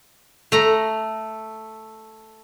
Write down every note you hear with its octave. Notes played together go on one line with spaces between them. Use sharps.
A3 A#5